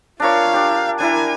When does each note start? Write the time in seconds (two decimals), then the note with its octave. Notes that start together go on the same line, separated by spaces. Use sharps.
0.20 D4 F4 A#4 C#5 F5
0.54 D4 G4
1.00 D4 E4 A#4 G#5